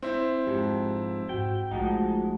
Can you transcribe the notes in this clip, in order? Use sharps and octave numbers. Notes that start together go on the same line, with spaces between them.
C4 E4
F2 G#2 G4
G#2 F#4 G5
A#1 F3 G#3 A3 D#4 F#4 F#5